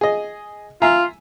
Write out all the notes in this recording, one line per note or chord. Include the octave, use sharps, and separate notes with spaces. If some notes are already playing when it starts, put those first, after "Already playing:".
G#4 D#5
F4 E5 G#5 A#5